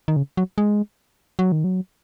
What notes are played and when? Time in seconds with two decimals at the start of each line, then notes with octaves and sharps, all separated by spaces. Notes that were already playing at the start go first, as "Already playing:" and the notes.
0.08 D#3
0.16 C#3
0.37 F#3
0.58 G#3
1.39 F#3
1.52 D#3
1.64 F#3